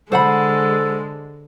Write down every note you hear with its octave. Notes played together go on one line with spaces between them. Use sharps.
D3 G#3 A4 C5 F#5 B5